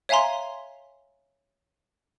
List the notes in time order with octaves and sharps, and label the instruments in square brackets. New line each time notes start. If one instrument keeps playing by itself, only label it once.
[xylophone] C#5 E5 F5 G#5 A#5 C6